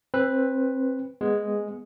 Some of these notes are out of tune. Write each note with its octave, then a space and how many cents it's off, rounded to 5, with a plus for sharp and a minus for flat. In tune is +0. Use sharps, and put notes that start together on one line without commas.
C4 +20 B4 +0
G#3 +0 B3 +0